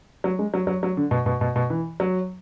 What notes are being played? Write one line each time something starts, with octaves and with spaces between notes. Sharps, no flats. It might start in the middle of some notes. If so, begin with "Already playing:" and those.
F#3
G#3
F#3
F#3
F#3
D3
B2
B2
B2
B2
E3
F#3